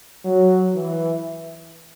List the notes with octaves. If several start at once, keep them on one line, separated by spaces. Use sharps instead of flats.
F#3
E3